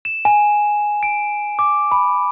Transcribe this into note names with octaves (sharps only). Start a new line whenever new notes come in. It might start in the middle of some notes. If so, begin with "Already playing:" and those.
E7
G#5
D7
D6
B5